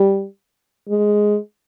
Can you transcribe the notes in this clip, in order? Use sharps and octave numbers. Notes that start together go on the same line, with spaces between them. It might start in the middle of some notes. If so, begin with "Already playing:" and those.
Already playing: G3
G#3